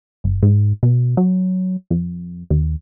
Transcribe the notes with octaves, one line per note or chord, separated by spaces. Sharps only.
G1
G#2
B2
F#3
F2
D#2